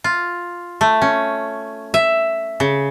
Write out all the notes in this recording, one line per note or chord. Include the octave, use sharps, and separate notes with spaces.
F4
A3
C#4
E5
C#3